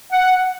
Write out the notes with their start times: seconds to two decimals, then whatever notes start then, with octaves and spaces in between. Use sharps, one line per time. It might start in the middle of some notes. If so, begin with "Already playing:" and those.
0.12 F#5